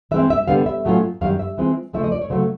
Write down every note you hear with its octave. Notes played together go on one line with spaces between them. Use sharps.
E3 G#3 C4 E5
E5
D3 G3 B3 F5
E5
A2 F#3 A3 C#4 F4
F#2 D#3 G3 F5
E5
E3 G#3 C4 F4
C#3 F3 A3 E5
D#5
D5
C#5
C#3 F#3 A3 C5